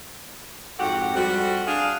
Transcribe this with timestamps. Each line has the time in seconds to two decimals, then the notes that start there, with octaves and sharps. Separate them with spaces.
0.79 F2 G#2 F#4 G4 A4 F#5
1.15 F2 G3 C4 F#4
1.66 D4 G#4 F5